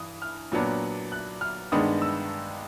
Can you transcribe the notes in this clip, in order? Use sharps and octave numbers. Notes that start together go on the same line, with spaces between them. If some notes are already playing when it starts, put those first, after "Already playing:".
Already playing: G2 E3 D#6
F6
A#2 F#3 B3 D4
F#6
F6
G2 D#3 G#3 B3 D4 D#6
E6